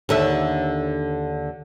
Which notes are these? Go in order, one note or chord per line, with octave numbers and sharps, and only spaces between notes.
D#2 D3 E5